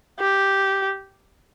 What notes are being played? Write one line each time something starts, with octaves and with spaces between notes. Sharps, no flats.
G4